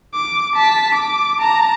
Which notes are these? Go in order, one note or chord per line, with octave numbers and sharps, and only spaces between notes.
D6
A5 B6
D6
A5 A#5